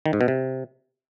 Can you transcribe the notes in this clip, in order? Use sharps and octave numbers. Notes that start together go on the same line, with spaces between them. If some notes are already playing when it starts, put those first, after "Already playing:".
D#3
G#2
B2
C3